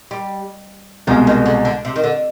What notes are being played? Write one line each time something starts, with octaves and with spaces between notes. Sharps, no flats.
G3
C2 B2 F3 G#3
D#3
D3
D3
C3
D#3
D3